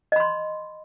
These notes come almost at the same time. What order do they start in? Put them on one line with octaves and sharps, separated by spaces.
D#5 B5 C6